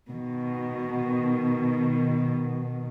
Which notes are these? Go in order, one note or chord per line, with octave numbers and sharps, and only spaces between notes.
B2 D#3